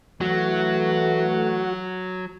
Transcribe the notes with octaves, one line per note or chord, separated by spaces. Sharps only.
E3 F#3 A3 F#4